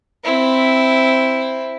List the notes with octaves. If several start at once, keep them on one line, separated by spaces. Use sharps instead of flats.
C4 E4